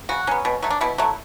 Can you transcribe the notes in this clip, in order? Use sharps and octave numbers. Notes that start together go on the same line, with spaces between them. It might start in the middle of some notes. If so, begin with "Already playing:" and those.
C#3 F#4
F#3 B3 C#4
B2
F#3 A3
D4
B2 E4
F#3 A3